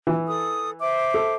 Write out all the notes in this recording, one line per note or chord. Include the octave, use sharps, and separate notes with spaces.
E3
A4 D#6
C5 E5 D6
A4